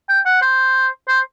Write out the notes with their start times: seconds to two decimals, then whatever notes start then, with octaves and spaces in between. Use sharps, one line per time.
0.09 G5
0.26 F#5
0.42 C5
1.08 C5